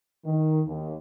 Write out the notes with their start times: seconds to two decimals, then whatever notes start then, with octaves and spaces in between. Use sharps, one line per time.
0.25 D#3
0.66 D#2